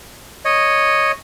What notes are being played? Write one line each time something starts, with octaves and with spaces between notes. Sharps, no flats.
C#5 D#5